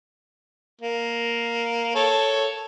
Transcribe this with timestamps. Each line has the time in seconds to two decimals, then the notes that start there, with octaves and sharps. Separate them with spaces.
0.81 A#3
1.95 A4 C#5